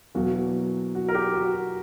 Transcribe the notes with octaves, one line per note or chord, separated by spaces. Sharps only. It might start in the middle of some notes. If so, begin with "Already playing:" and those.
E2 B2 F#3 A#3 F#4
F#4
A#4
G4
F#4